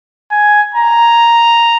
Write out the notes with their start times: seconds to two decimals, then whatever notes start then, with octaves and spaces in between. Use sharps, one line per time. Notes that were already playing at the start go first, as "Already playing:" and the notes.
0.31 G#5
0.75 A#5